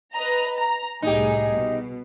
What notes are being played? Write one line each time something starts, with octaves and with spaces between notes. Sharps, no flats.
B4 D#5 A#5
A#5
C2 A2 D#4 G4 G#4
B2